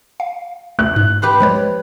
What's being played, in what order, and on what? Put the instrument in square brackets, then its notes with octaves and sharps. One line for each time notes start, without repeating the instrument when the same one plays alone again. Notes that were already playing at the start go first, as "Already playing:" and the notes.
[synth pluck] F5
[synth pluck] A3 [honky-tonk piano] F#6
[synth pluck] G#2
[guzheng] G4 B4 C6
[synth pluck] F3 G#3 C#5